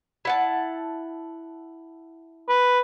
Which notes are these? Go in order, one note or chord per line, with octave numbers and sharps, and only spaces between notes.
E4 F#5 A5
B4